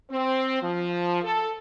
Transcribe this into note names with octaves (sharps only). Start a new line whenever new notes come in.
C4
F3
A4